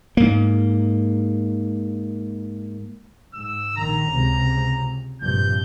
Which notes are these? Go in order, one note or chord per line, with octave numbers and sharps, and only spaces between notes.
G#2 A#3
G#2 E6
A#1 D#3 A#5
C#2 C3
A#1 G2 C3 G6